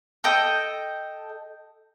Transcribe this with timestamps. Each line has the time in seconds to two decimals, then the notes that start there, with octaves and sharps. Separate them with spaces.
0.24 A4 D#5 G5